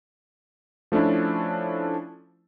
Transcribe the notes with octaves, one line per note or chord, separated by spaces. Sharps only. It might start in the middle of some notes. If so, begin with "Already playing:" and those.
F3 A3 C#4 D4 E4